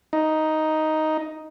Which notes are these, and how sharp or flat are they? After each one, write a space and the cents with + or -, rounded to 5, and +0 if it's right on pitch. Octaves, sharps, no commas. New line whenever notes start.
D#4 +5